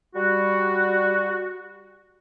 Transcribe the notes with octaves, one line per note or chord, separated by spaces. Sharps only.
G3 F#4